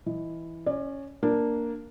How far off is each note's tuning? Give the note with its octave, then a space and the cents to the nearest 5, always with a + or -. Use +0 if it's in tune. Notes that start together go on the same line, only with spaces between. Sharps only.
E3 +0 D#5 -5
C#4 +0 D5 +30
A#3 +0 D4 +0